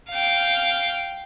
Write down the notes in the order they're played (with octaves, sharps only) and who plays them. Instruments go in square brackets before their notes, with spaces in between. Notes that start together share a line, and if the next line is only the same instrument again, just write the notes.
[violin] F5 G5